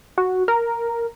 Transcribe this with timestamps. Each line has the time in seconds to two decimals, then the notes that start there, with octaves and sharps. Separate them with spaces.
0.18 F#4
0.48 A#4